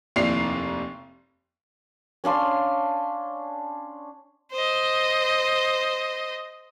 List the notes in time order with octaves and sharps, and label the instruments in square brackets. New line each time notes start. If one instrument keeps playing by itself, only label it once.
[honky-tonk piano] F1 D#2 E4 D5 C7 F7
[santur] C#4 D4 F5 C6
[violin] C5 D#5